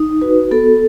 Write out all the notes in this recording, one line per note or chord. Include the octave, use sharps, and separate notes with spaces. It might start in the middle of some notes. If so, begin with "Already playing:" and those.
Already playing: D#4
F#4 B4
B3 A4